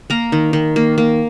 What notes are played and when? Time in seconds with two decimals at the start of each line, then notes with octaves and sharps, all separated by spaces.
0.10 A#3 A#4 A#5
0.32 D#3
0.53 D#3
0.76 A#3
0.98 A#3